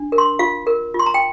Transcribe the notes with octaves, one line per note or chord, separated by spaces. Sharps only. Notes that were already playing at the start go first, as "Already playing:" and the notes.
Already playing: D4
A#4
C6
F4 F5
A#4
F4
C6
A#5
G5